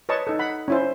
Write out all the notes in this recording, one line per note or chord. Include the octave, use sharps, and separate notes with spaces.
B4 C#5 D#5 A5 C#6
D#4 A4
F#5 B5
C#4 E4 C5